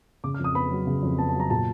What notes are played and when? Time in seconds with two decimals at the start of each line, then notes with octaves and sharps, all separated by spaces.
0.24 C#3 D6
0.34 F6
0.39 F2
0.44 D#6
0.55 B3 B5
0.71 F#3
0.87 C#3
1.03 F2
1.18 B3 A5
1.29 A5
1.34 F#3
1.40 A#5
1.50 A#2 A5